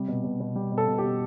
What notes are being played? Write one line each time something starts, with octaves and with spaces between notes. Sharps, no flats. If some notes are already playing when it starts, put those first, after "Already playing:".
Already playing: C3 G3
B2
B2
B2
G3
B2
A4
B2
G4
B2